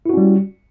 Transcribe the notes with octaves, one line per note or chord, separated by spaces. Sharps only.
G3 C#4 E4 F#4